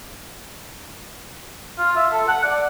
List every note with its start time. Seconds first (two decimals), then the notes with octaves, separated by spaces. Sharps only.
1.78 F4
1.96 E5
2.12 A4
2.28 F#5
2.44 D5